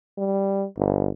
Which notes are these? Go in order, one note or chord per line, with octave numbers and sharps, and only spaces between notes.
G3
G1